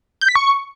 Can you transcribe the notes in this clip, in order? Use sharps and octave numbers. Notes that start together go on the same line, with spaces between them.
G6
B6
C#6